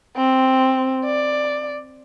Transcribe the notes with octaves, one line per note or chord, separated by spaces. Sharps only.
C4
D5